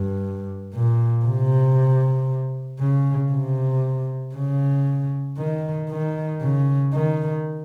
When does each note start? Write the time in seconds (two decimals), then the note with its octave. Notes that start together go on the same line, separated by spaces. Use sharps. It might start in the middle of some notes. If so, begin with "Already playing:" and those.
Already playing: G2
0.74 A#2
1.25 C3
2.81 C#3
3.32 C3
4.35 C#3
5.38 D#3
5.90 D#3
6.41 C#3
6.93 D#3